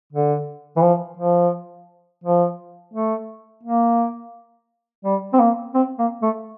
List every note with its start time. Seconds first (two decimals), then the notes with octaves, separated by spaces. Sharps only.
0.13 D3
0.76 E3
0.82 F3
1.17 F3
2.24 F3
2.94 A3
3.63 A#3
5.05 G3
5.33 C4
5.39 A#3
5.74 C4
5.99 A#3
6.23 A3